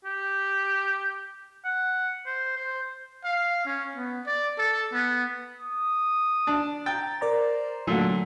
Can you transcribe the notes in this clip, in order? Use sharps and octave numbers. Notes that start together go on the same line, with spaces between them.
G4
F#5
C5
C5
F5
C#4
B3
D5
A4
B3
D#6
D4
G5 A#5 A6
A#4 C5 D5 A#5
A#2 D3 F#3 A3 E6